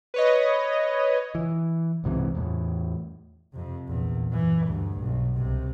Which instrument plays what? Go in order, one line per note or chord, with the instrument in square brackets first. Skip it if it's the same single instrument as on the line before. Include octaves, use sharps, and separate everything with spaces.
[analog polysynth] B4 C#5 D#5
[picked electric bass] E3
C2 G#2 C3 E3
E2 A2
[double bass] F2 C3
A#1 E2
F#2 E3
D2 G2
B1
C2 C3